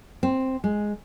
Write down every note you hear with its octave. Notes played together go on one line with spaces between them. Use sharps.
C4
G#3